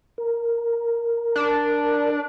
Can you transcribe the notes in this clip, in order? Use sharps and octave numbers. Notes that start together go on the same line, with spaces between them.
A#4
D4